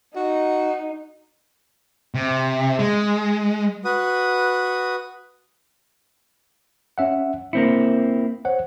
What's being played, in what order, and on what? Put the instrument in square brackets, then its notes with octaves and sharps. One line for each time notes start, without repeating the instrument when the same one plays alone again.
[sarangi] D#4 [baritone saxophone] F#4
[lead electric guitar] C3
G#3
[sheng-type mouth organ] F#4 B4 D#6
[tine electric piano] C#4 E5 F#5
[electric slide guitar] A#3 C4 E4 [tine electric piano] C#7
[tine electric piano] C5 C#5 F#5